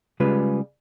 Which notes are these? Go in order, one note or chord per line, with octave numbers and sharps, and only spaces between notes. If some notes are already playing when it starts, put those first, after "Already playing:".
C#3 G3 G#3 F4 B4